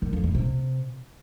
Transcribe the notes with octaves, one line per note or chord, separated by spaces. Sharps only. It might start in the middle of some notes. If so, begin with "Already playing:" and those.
D#3
F2
D#3
C3